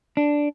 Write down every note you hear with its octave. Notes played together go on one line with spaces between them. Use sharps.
D4